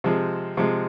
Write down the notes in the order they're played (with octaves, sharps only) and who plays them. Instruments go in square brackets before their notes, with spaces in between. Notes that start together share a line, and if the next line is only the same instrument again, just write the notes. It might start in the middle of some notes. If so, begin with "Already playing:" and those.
[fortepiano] C3 F3 G#3
C3 F3 G#3